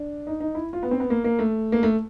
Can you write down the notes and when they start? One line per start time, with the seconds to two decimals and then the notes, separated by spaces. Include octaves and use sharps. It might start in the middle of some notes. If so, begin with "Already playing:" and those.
Already playing: D4
0.27 D#4
0.40 D#4
0.55 E4
0.73 F4
0.83 B3
0.91 C4
1.00 B3
1.10 A#3
1.24 A#3
1.39 A3
1.72 A#3
1.83 A3